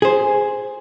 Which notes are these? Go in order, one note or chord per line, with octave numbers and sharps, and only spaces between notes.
G#4 C5